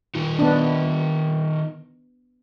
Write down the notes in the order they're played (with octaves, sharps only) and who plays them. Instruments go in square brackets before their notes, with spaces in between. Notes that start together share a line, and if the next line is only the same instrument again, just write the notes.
[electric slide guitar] D#3 D#4 F4
[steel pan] B3 D4